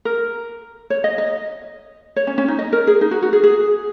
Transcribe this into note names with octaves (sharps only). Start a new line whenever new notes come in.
A#4
C#5
D#5
D#5
C#5
C#4
C#4
D#4
D#5
A#4
G#4
D#4
F#4
F#4
G#4
G#4